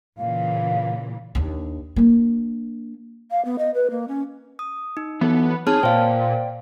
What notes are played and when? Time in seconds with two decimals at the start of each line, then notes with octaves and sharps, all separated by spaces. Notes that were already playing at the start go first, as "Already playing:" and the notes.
0.18 A#2 C#3 E3 F5
1.35 D#2 D4
1.96 A#3 D4
3.31 F5
3.45 B3
3.58 D#5
3.74 B4
3.90 A#3
4.08 C#4
4.59 D#6
4.97 D#4
5.21 E3 F#3 B3 A4
5.67 C4 D#4 G#4 C#5 A5 F6
5.83 A#2 C5 D5 F5 G5